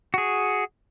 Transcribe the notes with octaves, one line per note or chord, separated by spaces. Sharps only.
F#4 G#4